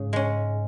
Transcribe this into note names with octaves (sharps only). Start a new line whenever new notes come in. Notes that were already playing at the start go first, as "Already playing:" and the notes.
Already playing: G#2 C#3
G#3 C#4